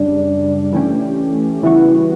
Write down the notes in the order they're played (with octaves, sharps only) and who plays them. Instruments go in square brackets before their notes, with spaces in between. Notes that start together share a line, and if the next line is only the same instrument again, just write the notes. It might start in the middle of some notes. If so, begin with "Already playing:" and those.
Already playing: [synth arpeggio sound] F#2 C#3 G3 [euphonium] D4
[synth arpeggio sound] E3 A3 C#4 G4
[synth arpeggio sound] C#3 E3 G3 B3 F#4 [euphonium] E4